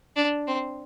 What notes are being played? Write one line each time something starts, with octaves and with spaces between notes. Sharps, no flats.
D4
C4